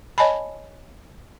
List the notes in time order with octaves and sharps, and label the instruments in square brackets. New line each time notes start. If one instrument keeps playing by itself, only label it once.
[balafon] C#5 D#5 G#5 A5 B5